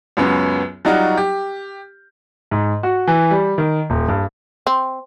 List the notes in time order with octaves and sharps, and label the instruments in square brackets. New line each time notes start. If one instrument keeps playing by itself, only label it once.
[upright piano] C#2 F#2 B3 C#4
F#3 G3 D#4 F4 F#4
G4
[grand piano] G#2
F#4
E3
G3
D#3
D#1
G2
[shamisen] C4